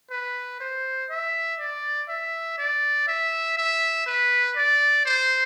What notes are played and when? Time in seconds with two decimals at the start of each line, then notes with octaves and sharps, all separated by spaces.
0.11 B4
0.60 C5
1.10 E5
1.60 D5
2.09 E5
2.58 D5
3.08 E5
3.57 E5
4.07 B4
4.56 D5
5.06 C5